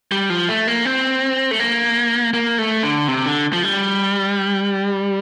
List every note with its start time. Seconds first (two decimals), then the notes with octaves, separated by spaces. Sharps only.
0.12 G3
0.30 F3
0.49 A3
0.68 A#3
0.85 C4
1.51 A3
1.60 A#3
2.33 A#3
2.58 A3
2.83 D3
3.08 C3
3.26 D3
3.53 F3
3.63 G3